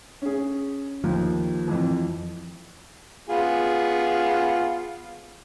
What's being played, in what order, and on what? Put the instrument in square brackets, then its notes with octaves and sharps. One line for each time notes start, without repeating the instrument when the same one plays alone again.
[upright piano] C#4 G#4
[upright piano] D#2 [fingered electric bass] F3
[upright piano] F2 E3
[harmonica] B3 F4 G#4